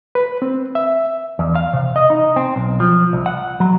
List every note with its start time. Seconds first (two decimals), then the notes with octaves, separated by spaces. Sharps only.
0.15 B4
0.42 C4
0.75 E5
1.39 E2
1.55 F5
1.73 C3
1.96 D#5
2.10 D#4
2.36 C4
2.56 B1
2.80 F3
3.13 C2
3.26 F#5
3.60 F#3